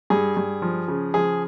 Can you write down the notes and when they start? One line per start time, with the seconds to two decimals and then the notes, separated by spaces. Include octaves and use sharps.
0.10 G2 G#4
0.37 G2
0.62 F3
0.88 C#3
1.14 F3 G#4